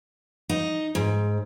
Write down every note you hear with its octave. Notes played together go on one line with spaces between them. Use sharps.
D#4
G#2